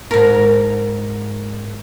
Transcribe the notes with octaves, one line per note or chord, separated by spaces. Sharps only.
G#2 A#4